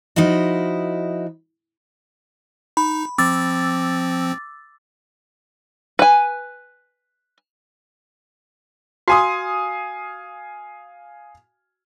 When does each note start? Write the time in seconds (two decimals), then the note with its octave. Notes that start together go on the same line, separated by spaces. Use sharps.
0.16 F3 D#4 E4 F#4 D#5
2.77 D#4 B5
3.18 F3 C4 D6 E6 A6
5.99 B4 G#5
9.08 F#4 F5 G#5 D#6